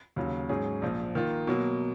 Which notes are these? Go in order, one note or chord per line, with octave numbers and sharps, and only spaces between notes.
D#2 C#3 F#3
G#2 F#3 C#4 G#4
A#1 A#2 F3
D#3 A#3 F4
B2 F#3 A#3